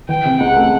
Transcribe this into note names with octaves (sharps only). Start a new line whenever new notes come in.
E3 G5
C3
C#2 F#5
A3